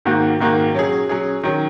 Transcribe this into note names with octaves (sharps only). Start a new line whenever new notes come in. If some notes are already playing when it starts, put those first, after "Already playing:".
G#2 D#3 A#3 F#4
G#2 D#3 A#3 F#4
F#3 C#4 G#4
F#3 C#4 G#4
D#3 F#3 C#4